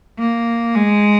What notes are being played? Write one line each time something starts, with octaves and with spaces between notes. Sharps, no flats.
A#3
G#3